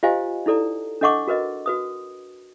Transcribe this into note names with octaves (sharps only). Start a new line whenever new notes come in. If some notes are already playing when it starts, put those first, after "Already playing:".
F4 G4 C5 D#5 F5 G#5
D#4 E4 A4 D5 A#5
D4 A4 D#5 F#5 C#6 D6
F#4 A#4 B4 D#5
F#4 B4 D#6